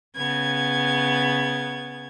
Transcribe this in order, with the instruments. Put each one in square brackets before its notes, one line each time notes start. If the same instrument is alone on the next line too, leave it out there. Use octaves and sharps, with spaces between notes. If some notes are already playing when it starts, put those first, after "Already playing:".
[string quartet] C#3 B3 G#6